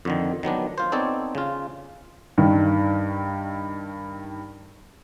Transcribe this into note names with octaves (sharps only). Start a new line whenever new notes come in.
F2 D3 D#3
D#3 F#3 B3 D4
F4 C5
B3 C4 D#4 A4 C#5 D5
C#3 F4
G2 D#3